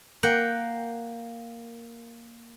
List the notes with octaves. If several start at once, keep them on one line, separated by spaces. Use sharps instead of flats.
A#3 F#5 G5